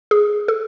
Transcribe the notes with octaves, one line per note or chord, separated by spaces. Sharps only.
G#4
A4